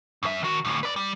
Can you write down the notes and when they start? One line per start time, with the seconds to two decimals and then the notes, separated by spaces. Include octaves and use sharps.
0.23 F#2 E5
0.43 D#3 F#4
0.65 D2 A2
0.83 B4 D5
0.96 G3